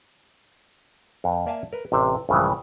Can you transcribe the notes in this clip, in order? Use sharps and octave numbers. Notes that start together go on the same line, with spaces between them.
F2
A#3 D5 E5 F5 G#5 A5
A#4 B4
A1 C3 C5
A#1 G2 C#3 E3 G#3